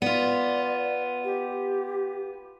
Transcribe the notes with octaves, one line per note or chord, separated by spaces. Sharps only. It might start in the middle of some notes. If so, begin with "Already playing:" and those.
B3 F4 D5
G4